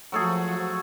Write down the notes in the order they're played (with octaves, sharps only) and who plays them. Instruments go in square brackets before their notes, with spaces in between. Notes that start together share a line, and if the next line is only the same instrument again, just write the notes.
[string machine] F3 F#4 [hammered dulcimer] F#3 A3 G#4